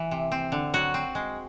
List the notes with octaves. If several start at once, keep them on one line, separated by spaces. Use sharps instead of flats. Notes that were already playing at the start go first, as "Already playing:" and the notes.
Already playing: E3
C3
C4
D3
F#3 F#4
C4
G#3